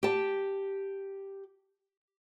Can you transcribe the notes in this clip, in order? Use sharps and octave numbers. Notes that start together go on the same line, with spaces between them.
G4 A5